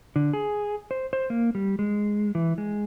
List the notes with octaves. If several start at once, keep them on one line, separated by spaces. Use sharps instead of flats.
D3
G#4
C5
C5
A#3
G3
G#3
E3
G#3